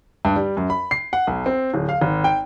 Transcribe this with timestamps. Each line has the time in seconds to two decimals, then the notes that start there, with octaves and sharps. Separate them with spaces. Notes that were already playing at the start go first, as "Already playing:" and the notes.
0.25 G2
0.36 G3
0.57 F#2
0.70 B5
0.91 C7
1.13 F#5
1.27 B1
1.46 C4
1.74 D1
1.89 F5
2.01 G#1
2.24 G5